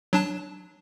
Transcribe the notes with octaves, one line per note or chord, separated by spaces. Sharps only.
F#3 D4 A5